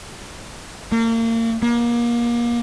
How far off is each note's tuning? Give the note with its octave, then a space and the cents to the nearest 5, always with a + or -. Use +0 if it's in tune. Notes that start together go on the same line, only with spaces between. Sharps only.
A#3 -35
A#3 +30